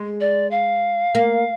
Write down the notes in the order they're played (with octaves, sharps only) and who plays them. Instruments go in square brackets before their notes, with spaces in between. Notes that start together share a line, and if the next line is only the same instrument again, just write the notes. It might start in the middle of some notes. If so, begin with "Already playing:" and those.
Already playing: [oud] G#3
[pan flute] D5
F5
[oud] A#3